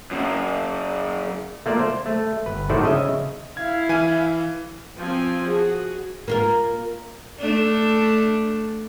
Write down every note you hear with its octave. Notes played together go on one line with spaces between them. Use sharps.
F#2 C#3
A3 A#3 F4 D5
C5
A3
G1 B4
A2 D#3 A3 F#4 C5 D5
C#3 D#5 E5
E4 F5 G#6
E3 G#5 D#7
F3 C4 G#5
F#4 G#4
A#3 F4 A#4
A3 D4